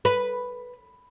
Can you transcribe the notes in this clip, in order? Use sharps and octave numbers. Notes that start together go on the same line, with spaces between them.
B4